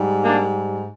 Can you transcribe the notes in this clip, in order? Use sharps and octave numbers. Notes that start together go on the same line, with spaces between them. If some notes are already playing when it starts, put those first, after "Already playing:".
Already playing: G#2 G3
A#3 D4